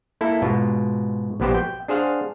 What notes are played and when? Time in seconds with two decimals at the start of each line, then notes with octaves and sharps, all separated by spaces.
0.21 A#3 E4 A4
0.42 G#2 B2 F4
1.40 A#1 B2 B3 G4 C5
1.55 G5
1.88 D4 G#4 C5 F5 F#5